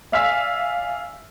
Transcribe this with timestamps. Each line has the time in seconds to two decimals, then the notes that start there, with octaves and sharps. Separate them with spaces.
0.12 D5 E5 F5 G#5 E6 B6